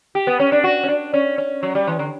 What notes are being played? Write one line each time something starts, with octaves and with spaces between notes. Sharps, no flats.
G4
B3
C#4
D4
F#4
C#4
D4
C#4
C#4
F#3
G3
E3
D3